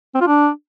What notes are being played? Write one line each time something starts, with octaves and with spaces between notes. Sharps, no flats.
C4
F4
D4